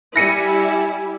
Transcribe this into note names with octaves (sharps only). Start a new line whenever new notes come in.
G3 E4 G#5 A#6 C#7 D#7